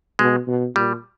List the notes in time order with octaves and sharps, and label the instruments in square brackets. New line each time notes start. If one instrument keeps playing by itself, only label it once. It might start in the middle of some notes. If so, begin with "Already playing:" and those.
[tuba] B2 [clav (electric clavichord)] G#3
[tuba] B2
[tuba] A#2 [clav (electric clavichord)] G3